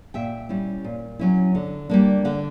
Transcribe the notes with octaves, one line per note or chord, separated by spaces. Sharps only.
A#2 E5 G5
G3 C#4 E4
A#2
F#3 C#4 E4
D3
G3 A#3 D4
D3 D5 F#5